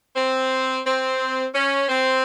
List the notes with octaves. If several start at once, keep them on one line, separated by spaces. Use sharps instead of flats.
C4
C4
C#4
C4